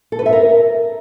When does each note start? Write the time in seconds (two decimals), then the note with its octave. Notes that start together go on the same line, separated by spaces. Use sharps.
0.12 A4
0.19 B4
0.26 E5
0.33 A#4